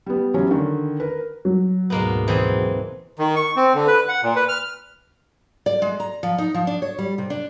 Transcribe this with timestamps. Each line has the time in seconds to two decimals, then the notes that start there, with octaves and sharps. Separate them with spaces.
0.06 G3 B3
0.34 E3 F#3 G3 C#4
0.51 D3 D#3
1.00 A#4 B4
1.45 F#3
1.90 D2 G#2 B2 G#3 A#3 B3
2.28 E3 C4 G#4
3.19 D#3
3.36 C#6
3.56 C4
3.75 D3
3.88 B4
4.09 F#5
4.23 A#2
4.36 B4
4.49 F6
5.66 D5
5.82 G#3
6.00 A#5
6.23 F3
6.38 D#4
6.54 F3
6.67 D4
6.82 C#5
6.98 G3
7.18 C3
7.30 D4